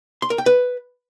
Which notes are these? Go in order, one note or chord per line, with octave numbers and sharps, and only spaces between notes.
C6
A#4
G5
B4